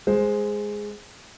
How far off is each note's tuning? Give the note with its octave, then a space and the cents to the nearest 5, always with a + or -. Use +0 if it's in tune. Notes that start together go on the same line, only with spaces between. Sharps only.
G#3 +0 C5 +0